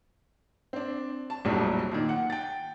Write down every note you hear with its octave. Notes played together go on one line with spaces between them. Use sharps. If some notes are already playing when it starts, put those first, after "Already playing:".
C4 D4
A5
F1 A#1 F2 A2 F#3 G3
A#2 D#3
F#5
G5 A6